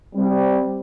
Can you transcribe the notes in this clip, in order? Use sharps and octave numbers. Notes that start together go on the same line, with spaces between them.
G3 C4